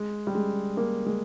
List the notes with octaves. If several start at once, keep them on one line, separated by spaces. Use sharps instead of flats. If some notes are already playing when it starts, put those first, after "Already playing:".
Already playing: G#3
G3
G#3
A#3
G#3